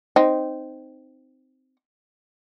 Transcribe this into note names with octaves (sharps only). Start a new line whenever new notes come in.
C4 D#4